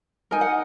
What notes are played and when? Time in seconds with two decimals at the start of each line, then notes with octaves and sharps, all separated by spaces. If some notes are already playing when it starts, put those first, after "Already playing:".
0.31 D#4 A#4 G#5
0.41 F#5